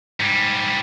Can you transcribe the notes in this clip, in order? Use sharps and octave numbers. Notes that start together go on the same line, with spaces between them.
G#2 G3